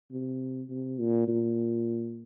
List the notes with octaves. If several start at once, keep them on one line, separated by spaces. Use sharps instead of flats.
C3
C3
A#2
A#2